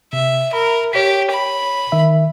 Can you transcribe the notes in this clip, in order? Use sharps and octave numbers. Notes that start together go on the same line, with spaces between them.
C3 E5
A#4 B5
G4 C#5 B6
B5
D#3 E5